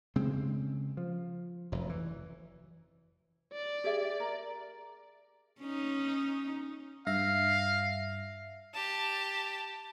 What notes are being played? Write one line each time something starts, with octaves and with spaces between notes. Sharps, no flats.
C#3 G#3 C4
F3
F1 F#2
E3
D5
G4 G#4 E5
A#4
C#4 D#4
G2 E5 F5 A#6
G4 A5